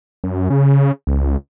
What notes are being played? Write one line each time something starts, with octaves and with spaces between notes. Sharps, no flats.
F#2
C#3
C#2